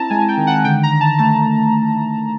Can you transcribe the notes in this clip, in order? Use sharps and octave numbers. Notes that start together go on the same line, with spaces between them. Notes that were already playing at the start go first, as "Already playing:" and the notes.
Already playing: C4 E4 A5 A#5
G#3 G#5
G5
D#3
F#5
D3 G5
A#5
D3
A5
A3 A5